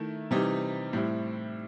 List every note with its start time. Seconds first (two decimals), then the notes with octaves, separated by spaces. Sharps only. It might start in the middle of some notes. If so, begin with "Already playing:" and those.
Already playing: D#3 A3 E4
0.31 C3 E3 G3 D#4
0.93 A2 G3 C4 E4